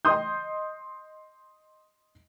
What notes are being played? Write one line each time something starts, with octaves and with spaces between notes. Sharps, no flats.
D#5 C6 D#6 G6